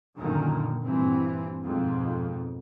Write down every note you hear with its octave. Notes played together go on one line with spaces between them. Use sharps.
F#2 A#2 D3 D#3
G2 A#2 E3 C4
F2 G#2 B2